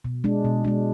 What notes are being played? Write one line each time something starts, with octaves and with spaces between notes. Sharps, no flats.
B2
G#3 D4
B2
G#3 D4